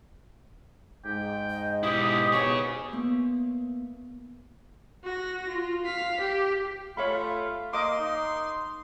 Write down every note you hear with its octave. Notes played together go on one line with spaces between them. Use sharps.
G#2 G5
D#5
B2 E4 G4 D#6
B2 G#4 C#5 C#6
A#3 B3
F#4 A#6
F4
F5 B6
G4
A3 F4 C#5 F5 B5
A#3 D#5 F5 C6 D6
D#4